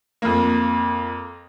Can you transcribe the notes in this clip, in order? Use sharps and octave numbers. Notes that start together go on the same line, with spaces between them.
F2 A#3